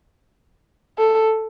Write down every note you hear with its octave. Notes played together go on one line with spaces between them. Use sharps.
A4